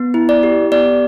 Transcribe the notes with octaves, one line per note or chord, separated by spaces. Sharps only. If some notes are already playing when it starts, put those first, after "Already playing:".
Already playing: B3
E4
D5
G4
B3 D5